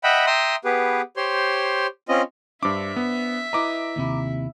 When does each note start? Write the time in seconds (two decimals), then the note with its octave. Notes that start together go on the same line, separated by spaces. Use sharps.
0.04 D#5 E5 F#5 G5 B5
0.27 E5 G5 A#5 C6 D#6
0.65 B3 G4 G#4 B4
1.16 G4 C5 C#5 C6
2.09 C4 C#4 F4 D#5
2.63 G2 D4 C5 D5 E5 D6
2.96 B3
3.53 E4 B4 D#5 A#5 D6
3.96 D#2 C3 E4